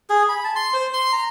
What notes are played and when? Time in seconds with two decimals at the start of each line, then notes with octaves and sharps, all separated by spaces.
0.10 G#4
0.29 B5
0.44 A5
0.56 C6
0.74 C5
0.93 C6
1.13 A#5